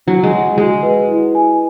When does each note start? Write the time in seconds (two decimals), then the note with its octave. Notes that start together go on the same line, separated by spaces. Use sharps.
0.07 F#3 D4
0.23 G#3
0.32 F#5
0.58 G#3 F#4
0.83 B4
1.09 E4
1.35 G#5